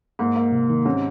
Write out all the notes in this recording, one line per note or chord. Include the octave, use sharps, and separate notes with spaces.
G#2 A#3
A#3
C3
D#3
G#2 C3 C#4